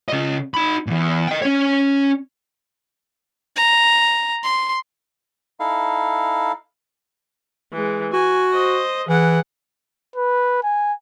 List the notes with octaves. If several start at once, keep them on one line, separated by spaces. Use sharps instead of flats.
C#3 D#5
D#4 B5
E2 A#2
D#5 G5
C#4 C#5
A#5
C6
D#4 E4 A4 F5
E3 G#3
F#4 G#5
C5 D#5
E3 G#4 F#5
B4
G#5